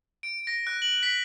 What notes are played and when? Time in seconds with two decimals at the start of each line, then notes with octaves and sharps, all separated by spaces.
0.23 D7
0.47 A#6
0.67 F#6
0.82 F#7
1.03 B6